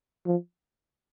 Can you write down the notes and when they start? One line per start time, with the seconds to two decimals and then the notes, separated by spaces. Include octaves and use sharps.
0.26 F3